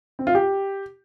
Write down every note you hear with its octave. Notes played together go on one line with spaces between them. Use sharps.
C4
F4
G4